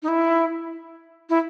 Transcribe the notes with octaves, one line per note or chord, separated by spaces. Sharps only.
D#4
E4
E4